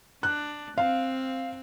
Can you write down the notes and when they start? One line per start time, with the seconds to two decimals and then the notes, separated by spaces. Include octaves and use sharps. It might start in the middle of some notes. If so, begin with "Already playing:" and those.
0.23 D4 F#6
0.78 C4 F5